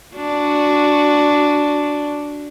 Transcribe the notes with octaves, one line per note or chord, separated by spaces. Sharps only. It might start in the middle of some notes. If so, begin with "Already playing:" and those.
D4 F#4